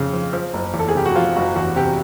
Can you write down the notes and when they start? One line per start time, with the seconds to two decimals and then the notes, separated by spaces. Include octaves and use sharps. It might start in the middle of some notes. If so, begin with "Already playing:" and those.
Already playing: F2 C#3
0.13 F3
0.33 F3
0.53 F#1
0.74 E2
0.79 A4
0.89 G#4
0.95 C3 G4
1.06 F#4
1.15 F3 F4
1.36 F#1 F#4
1.56 E2 F#4
1.76 C3 G4